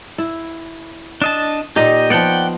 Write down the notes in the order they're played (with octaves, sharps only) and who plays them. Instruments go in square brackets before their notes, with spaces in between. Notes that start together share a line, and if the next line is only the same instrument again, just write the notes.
[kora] E4
[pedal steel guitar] D4 D#5 A5
[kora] A#2 D#4 [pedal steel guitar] G4 D#5
[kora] F3 B3 [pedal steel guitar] D5 F#5 G5